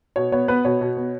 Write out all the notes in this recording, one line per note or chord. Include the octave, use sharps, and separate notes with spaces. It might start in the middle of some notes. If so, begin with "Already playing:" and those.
B2 C#5
B3 C#5
B3 B4
B2 C#5
B2
B3